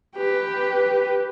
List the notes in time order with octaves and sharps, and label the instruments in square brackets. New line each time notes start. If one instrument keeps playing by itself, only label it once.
[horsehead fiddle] G4 B4